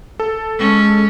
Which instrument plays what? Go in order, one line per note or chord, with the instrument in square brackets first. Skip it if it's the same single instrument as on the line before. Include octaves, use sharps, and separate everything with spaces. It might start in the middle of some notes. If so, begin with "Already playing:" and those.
[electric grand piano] A4
[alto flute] G#3 [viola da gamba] C#4